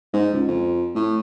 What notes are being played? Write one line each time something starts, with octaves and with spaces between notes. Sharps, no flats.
G#2
C#2
F2
A2